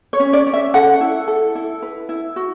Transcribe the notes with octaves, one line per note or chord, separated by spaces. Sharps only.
C#5
C#4
D5
C#4
E5
A4 F#5
E4
A4
E4
B4
E4
F#4